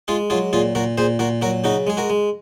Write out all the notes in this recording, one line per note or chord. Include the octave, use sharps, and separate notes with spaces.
G#3 F4 G#4
F#3 F4 G#4
A#2 F4 G#4
A#2 F#4 A#4
A#2 G#4 C5
A#2 F#4 A#4
F#3 F#4 A#4
C#3 D#4 F#4
G#3 G#4
F#4 A#4
G#3